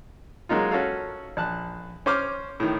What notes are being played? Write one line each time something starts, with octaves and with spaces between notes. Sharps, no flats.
F#3 G#3 A#3 D#4 F4
C#4 F#4 A4 F5
A#1 A5 F#6
C#4 C5 D6 F6
A2 D#3